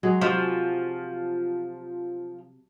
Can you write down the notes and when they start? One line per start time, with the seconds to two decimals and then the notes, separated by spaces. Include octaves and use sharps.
0.03 F#3 G#3 G#4
0.21 C3 F3 F#3